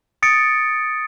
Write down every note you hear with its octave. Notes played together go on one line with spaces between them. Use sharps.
D#6 A6 C#7 D7